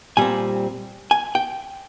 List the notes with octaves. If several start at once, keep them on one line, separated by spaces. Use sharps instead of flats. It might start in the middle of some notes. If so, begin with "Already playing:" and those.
A#2 G3 C4 G#5
G#5
G5